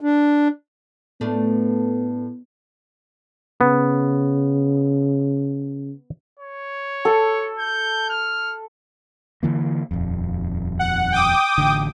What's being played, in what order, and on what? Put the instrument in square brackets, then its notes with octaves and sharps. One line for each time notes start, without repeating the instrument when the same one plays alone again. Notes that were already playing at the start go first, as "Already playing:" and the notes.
[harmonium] D4
[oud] A2 A3 D4 [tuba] B3
[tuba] C#3 [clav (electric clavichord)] B3
[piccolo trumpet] C#5
[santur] A4
[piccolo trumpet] G6
F6
[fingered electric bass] D3 E3 A#3
D#1 F2
[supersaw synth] F#5
G5 D6 D#6
[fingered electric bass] A1 D3